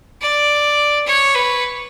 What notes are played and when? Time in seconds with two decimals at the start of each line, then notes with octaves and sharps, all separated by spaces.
0.21 D5
1.07 C#5
1.35 B4